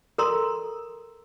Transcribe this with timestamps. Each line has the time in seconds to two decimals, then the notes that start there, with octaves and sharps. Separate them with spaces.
0.18 A4 A#4 A#5 C6